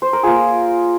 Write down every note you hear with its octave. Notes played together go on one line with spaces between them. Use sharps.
C5
A#4
A#3 F4 G#4